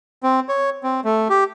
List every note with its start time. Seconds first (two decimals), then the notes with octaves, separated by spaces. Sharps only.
0.23 C4
0.49 C#5
0.83 C4
1.04 A3
1.30 G4